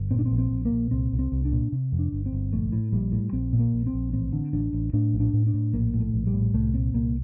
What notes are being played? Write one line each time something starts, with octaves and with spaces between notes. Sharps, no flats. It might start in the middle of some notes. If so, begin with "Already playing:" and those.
Already playing: G1
A#2 C4
D4
C4
A#1
C4
A#1
A#3
A#2
C2 C4
C2
C4
C2
D4
A#2
C3
F2
D4
G1
C4
G1
A#1 A3
A2
A#1 G3
A2
A#1 C4
A#2
A#3
A#1
C4
A#1
A1 C4
D3
A1 D4
A1
A2 D4
A#1
D4
A2
D4
A2
A#1 A#3
A2
A3
A#1
G3
A2
C2 A3
A#2 C4
C2 A#3